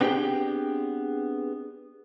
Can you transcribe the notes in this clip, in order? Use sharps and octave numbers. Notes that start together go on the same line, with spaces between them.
B3 C4 D4 G4 G#4 G5